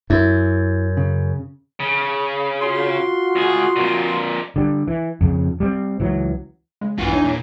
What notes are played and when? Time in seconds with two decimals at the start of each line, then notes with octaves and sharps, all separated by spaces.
0.10 F#2 E4
0.97 C#3
1.80 C#3
2.61 F4 F#4 C6
3.36 C#2 G#4
3.76 F2 A#2
4.56 D3 G3
4.88 E3
5.21 F2 C#3
5.60 G3 G#3 C4
6.00 C#2 E3 F#3
6.81 C#3 G#3
6.98 A#1 E2 G2 E3 F4 F#4
7.13 D4 D#4 C#5
7.24 A#2